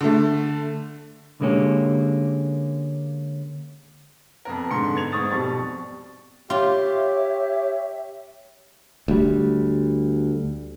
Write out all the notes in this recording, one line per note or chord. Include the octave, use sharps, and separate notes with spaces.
D3 A3
D3 G#3 A#3 C#4 G4
F2 B3 A#4
G#2 D3 C6 C#7
B3 G#6 F7
G#2 C4 C#6 D#6 A6
F2 B2 G3 C#6 A6
F4 G4 C#5 E5
D2 G3